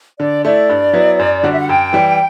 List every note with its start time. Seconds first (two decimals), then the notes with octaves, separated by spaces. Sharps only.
0.19 D3 D5
0.44 A3 E4 D5
0.69 G2
0.93 F#3 B3 E4
1.19 F#2
1.43 D3 G3 D4 F#4
1.52 E5
1.60 F#5
1.69 F#2 G5
1.93 E3 G3